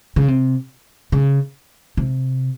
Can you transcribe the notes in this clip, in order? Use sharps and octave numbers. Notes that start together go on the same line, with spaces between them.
C#3
C3
C#3
C3